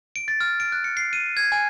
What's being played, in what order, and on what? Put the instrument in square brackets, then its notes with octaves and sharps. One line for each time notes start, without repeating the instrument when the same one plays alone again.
[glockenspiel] D7
A6
F6
D7
F#6
C#7
C7
D#7
G#6
G#5